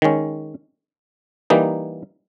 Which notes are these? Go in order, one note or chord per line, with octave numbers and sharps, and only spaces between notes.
D#3 G#3 C#4
E3 G3 A#3 D#4